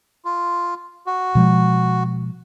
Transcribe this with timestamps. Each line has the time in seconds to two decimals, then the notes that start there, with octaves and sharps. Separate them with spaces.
0.25 F4
1.06 F#4
1.35 B2 F3 G#3